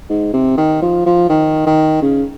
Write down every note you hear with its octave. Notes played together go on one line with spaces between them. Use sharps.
G#2
C3
D#3
F3
F3
D#3
D#3
C#3